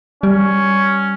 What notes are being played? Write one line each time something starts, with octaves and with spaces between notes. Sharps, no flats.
G3 C#4